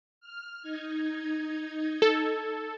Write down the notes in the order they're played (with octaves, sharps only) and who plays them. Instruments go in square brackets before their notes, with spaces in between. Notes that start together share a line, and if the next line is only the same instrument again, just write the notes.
[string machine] F6
D#4 G#6
[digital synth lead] A4